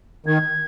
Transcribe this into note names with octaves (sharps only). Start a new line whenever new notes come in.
D#3 G#6